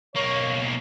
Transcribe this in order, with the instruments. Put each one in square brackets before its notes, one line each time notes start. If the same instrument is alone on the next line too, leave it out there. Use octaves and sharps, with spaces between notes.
[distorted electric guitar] B1 A#3 [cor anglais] C#5